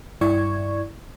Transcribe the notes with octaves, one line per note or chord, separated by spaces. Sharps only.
G2 E4 D5 C#6 G#6